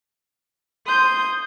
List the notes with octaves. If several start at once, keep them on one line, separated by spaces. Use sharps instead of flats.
C6 D#6 G6